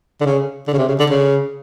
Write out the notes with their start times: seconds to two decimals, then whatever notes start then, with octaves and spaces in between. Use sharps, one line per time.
0.21 D3
0.26 C#3
0.68 D3
0.74 C#3
0.79 C3
0.89 C#3
1.00 D3
1.10 C#3